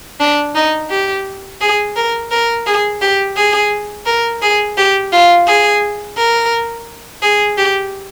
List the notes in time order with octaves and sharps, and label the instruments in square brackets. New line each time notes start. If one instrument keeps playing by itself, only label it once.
[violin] D4
D#4
G4
G#4
A#4
A#4
G#4
G4
G#4
A#4
G#4
G4
F4
G#4
A#4
G#4
G4